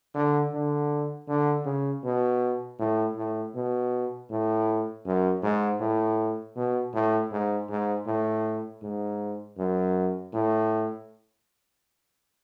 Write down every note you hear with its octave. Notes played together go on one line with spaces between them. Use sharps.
D3
D3
D3
C#3
B2
A2
A2
B2
A2
F#2
G#2
A2
B2
A2
G#2
G#2
A2
G#2
F#2
A2